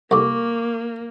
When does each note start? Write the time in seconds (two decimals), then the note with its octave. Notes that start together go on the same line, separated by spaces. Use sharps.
0.11 C2 F2 A#3 C#6 D6